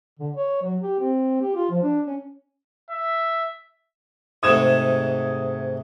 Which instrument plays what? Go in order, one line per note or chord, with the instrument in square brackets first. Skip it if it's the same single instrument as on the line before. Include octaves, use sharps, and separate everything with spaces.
[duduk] D3
C#5
F#3
G4
C4
G4
F4
F3
D4
C#4
[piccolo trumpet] E5
[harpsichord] G#2 C3 A3 [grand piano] D#6 G#6 E7